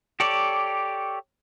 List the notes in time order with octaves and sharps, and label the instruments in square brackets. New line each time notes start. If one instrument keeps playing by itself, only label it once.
[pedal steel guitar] G4 A4 C#5 D5